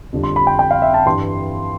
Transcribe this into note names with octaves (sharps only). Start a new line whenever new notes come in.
F2 D3 G3
C6
B5
G5
G5
F5
E5
A5
G2 E3 G3 C6